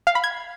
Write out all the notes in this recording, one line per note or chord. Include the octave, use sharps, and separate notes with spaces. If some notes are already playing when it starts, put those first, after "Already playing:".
F5
B5
G#6